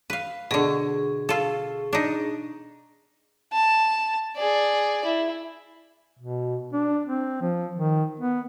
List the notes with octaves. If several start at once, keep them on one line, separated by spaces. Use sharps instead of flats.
B4 F5
B2 D3 G#4 C#6
F4 A4
D4 D#4
A5
G#4 D5
E4
B2
D4
C4
F3
D#3
B3